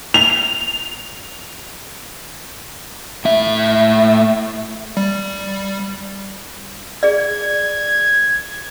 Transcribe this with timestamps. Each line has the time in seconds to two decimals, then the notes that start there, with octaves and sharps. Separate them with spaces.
0.14 F7
3.25 A2 E5
4.97 G3
7.03 G#4 D5 G#6